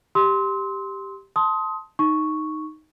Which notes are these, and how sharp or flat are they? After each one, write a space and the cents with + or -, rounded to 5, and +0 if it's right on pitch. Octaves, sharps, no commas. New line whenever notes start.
G4 +0 C6 +0 E6 -45
A5 +0 C6 +0 D#6 +25
D#4 +0 C#6 +0